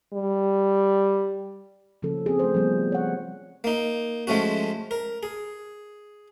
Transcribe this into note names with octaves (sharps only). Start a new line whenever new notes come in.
G3
C#3 F3 A#3 C#4 A4
C4 G#4
A3 C5
F3 G3 B3
C#5 F#5
A#3 D#4
F3 G#3 A3 C#4 F#4
A#4
G#4